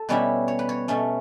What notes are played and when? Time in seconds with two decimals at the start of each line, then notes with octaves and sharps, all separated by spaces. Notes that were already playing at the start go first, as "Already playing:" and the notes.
Already playing: A4
0.09 B2 G3 C#4 E4 B4
0.48 C#5
0.59 B4
0.69 C#5
0.88 B2 A3 C#4